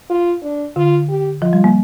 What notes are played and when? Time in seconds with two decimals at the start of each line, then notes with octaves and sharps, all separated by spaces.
0.10 F4
0.43 D4
0.76 D3 F4
1.09 G4
1.42 F3 F4
1.53 G3
1.64 A#3